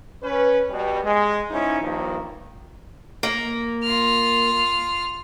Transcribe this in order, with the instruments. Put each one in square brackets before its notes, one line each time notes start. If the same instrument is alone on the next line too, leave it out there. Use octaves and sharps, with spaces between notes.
[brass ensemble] C#4 B4
B2 G3
G#3
G#2 C#4 D#4 E4
G2 D#3 F3 A#3
[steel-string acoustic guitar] A#3
[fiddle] F4 F6